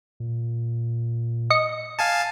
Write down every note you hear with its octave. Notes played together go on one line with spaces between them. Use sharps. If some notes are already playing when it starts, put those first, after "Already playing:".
A#2
D#5 C#7
F5 G#5 A5